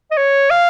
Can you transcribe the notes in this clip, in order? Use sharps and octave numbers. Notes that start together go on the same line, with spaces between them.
D#5
C#5
F5